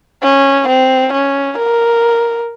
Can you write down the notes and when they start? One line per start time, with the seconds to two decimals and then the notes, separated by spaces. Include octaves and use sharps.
0.22 C#4
0.68 C4
1.13 C#4
1.58 A#4